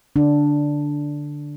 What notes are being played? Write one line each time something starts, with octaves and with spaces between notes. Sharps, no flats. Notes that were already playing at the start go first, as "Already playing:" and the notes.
D3 D4